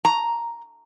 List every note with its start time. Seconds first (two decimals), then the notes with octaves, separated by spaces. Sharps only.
0.05 A#5